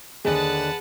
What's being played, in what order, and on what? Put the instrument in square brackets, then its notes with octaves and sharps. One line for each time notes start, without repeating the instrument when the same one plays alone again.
[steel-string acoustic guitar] D#2 D3 [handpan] G#4 [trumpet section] B4 F#5 A5